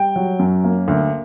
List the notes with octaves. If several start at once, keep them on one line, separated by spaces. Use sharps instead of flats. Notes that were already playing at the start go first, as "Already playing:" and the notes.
Already playing: G3 G5
F#3
F#2
A#3
D2